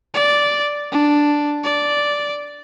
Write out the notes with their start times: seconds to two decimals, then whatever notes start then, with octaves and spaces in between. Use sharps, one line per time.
0.14 D5
0.92 D4
1.64 D5